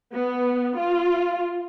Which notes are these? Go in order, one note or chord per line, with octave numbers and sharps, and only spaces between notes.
B3
F4